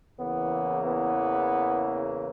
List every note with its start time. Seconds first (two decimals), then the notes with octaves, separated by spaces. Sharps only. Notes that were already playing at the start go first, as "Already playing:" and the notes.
0.19 E2 C#3 E3 A#3 B3
0.85 B3